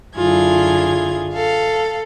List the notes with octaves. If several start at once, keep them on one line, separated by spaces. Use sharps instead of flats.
F#2 D3 E4 F4 G#4 G#6
A4 F5